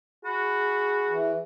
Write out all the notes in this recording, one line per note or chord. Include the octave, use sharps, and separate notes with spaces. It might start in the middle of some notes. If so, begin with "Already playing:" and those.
F#4 G#4 B5
E3